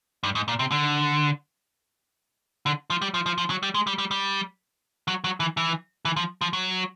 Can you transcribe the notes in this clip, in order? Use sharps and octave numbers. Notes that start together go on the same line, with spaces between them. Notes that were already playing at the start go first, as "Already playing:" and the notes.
G2
G#2
A#2
C3
D3
D3
F3
G3
F3
F3
F3
F#3
G3
G#3
G3
G3
G3
F#3
F#3
E3
E3
E3
F3
F3
F#3